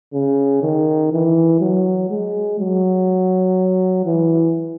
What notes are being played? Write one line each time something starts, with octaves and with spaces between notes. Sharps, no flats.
C#3
D#3
E3
F#3
G#3
F#3
E3